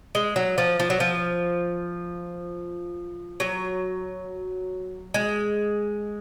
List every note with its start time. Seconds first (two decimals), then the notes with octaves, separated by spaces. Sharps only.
0.15 G#3
0.36 F#3
0.58 F3
0.80 F3
0.90 F#3
1.00 F3
3.40 F#3
5.14 G#3